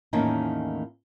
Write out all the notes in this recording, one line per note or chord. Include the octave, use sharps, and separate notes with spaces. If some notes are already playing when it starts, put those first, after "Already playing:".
E2 A2 D#3 A#3 C#4 D#4